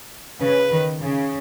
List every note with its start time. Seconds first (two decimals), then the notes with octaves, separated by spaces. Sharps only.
0.41 C#3 B4
0.71 D#3
1.01 C#3